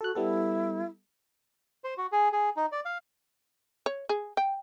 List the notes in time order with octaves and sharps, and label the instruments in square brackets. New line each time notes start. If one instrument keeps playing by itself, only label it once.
[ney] F#4 [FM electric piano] A4 F#6
[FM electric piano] G3 B3 A4 [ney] E4
[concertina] C5
F#4
G#4
G#4
D#4
D5
F5
[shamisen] C#5
G#4
G5